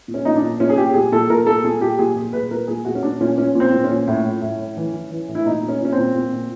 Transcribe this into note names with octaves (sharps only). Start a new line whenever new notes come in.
A#2
C#4
A#2 D#4
D4
A#2
A#2 C#4
G#4
A#2 G4
A#2 G#4
A#2 A4
A#2 A#4
A#2 A4
A#2 G#4
A#2 G4
A#2 G#4
A#2 G#4
A#2 B4
A#2 A#4
A#2 G#4
A#2 F#4
C#4
A#2 D4
A#2 C#4
A#2 C#4
A#2 C4
A#2
C#4
A#2
A2
A2
A2
A2
E3
E3
E3
A2
E4
A#2 D#4
A#2
C#4
A#2 C#4
C4
A#2
A#2
A#2